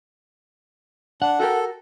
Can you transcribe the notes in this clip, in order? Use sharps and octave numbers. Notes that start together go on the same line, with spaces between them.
D4 F#5
F#4 G4 A4 A#4